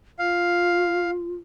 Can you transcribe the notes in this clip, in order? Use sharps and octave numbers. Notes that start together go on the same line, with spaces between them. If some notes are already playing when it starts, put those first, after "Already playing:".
F4 F5